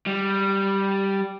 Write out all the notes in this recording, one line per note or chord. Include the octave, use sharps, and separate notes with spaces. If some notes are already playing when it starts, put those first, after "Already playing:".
G3